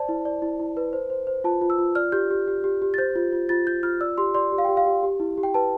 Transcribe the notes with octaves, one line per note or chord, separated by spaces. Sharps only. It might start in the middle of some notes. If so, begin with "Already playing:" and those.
Already playing: C5 D5 A5
E4
D5
E4
E4
B4
C5
C5
C5
F4 A5
F4
E6
F4
D5 F6
G4 G6
G4
G4
G4
G4
A6
C5 G6
F4
F4
F4 A6
F4 G6
F4 F6
D5 E6
G4 C6
D5 C6
G4
F5
G4 G5
F5
G4
G4
E4
G4
G5
B4 A5